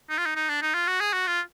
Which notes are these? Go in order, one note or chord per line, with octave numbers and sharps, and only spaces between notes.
D#4
F4
D#4
D#4
D4
D#4
F4
F#4
G#4
F#4
F4